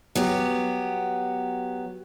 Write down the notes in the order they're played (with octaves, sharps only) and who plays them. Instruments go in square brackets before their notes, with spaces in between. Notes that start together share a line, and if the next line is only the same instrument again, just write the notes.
[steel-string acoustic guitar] F#3 B3 G4